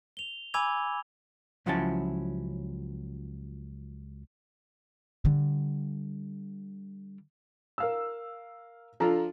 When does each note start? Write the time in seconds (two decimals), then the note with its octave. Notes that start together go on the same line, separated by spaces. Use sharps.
0.17 F7 G7
0.54 G#5 B5 D6 E6 G#6 F7
1.66 C#2 F3 F#3 C#4 E4 A5
5.25 D3 G3
7.78 A#4 F5 E6
9.00 F3 D4 F4 A4 A#5